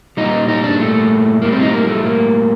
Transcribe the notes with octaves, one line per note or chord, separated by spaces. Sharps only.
A#2 G3 D#4
D#4
D4
A3
A2 G3 A#3
C4
D#4
A#3
A3
A#3